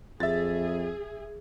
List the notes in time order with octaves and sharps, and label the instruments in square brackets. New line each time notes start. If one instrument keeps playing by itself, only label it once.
[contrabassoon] F2 [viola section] G#4 [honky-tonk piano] E5 A6